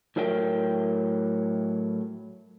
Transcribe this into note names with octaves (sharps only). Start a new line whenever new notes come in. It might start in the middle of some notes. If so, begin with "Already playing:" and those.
A2 F#3 A#4 E5 G5